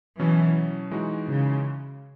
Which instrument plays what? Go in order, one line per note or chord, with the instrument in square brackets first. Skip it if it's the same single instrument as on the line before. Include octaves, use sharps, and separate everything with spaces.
[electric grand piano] B2 F#3 C#4 [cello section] E3
[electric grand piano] E3 G#3 D#4 F#4
[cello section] C#3